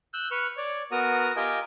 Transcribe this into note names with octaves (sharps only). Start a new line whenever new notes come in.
E6 F#6 G6
B4 C#6 F6
C#5 D5
B3 F#4 A#4 A#5 D#6
F4 G4 A#4 D#5 G5 G#5